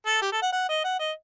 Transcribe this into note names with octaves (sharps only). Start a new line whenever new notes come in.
A4
G4
A4
F#5
F#5
D#5
F#5
D#5